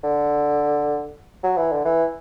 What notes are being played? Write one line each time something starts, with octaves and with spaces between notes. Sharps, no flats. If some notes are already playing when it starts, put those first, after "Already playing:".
D3
F#3
E3
D3
E3